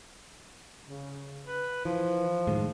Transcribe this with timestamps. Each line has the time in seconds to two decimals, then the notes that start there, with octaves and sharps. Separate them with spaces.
0.87 C#3
1.47 B4
1.85 E3 F3
2.47 A2 D#3 G#3